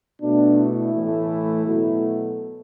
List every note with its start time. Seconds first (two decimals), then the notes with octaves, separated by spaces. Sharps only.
0.21 B2 A3 D4
0.57 E4
0.93 A2 E3 A3
1.65 B2 F#3 A3